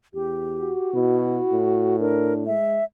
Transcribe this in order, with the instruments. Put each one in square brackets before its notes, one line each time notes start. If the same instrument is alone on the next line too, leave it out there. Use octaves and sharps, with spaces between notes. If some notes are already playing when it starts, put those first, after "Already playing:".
[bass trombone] E2 [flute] G4
[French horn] F#4
[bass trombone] B2 [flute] E4
[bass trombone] A2
[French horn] D4 [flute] A#4
[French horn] G#3 [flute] E5